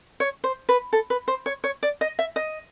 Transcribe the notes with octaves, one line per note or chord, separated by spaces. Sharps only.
C#5
C5
B4
A4
B4
C5
C#5
C#5
D5
D#5
E5
D#5